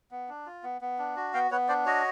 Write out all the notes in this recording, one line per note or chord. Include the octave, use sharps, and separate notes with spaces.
B3
D4
F4
B3
B3
D4
F#4
B3 F5 G5
B3 B4 C#5
D4 C5 D5
F#4 C#5 D#5